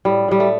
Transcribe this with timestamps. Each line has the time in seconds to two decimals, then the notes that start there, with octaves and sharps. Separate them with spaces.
0.05 A2 G3
0.28 A2 G3
0.40 A3